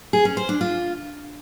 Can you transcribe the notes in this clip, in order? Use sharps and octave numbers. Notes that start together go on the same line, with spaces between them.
G#4
C#4
C5
D4
F4